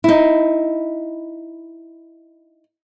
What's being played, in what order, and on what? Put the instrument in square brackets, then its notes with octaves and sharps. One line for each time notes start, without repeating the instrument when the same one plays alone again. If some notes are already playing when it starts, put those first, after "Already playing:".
[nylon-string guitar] D#4 E4